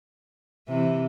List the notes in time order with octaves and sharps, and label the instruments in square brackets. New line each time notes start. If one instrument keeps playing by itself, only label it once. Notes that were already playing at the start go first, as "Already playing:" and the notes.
[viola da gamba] C3 E3